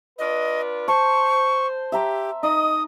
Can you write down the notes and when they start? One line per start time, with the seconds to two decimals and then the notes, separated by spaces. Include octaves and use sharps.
0.19 D4 F4 B4 D#5
0.88 C5 A5 C#6
1.92 G4 E5 A#5 C6
2.43 D#4 D#5 D#6